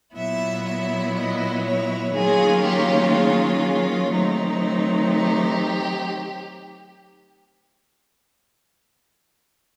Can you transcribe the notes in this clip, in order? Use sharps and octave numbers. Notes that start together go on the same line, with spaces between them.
A#2 F#3 B3 E4 E5
E5
D#5
C#5
D#3 F#3 A#3 C#4 F4 G#4
G4
G#4
G#4
D#3 F#3 A3 C4 D#4
G4